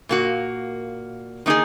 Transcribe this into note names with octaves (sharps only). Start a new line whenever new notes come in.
A#2 A#3 F#4
D#3 A#3 D#4 G#4